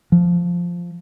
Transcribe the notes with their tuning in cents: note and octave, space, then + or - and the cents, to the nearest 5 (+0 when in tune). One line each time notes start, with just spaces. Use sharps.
F3 +0